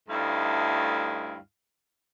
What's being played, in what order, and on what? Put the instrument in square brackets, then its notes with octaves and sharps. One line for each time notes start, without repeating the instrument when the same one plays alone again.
[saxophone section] D2 G2 A3 D#4 E4 F5